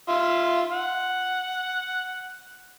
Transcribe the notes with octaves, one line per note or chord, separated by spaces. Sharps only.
F4 E5
F#5